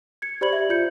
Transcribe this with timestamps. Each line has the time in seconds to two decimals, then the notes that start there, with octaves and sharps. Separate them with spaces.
0.22 G#6 C#7
0.41 G4 C5 D5 B5 G#6 F#7
0.53 E5
0.69 F4 G6 C#7